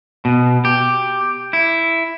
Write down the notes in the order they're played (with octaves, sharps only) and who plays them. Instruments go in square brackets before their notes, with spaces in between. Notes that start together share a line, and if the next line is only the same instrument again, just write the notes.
[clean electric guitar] B2
G4
E4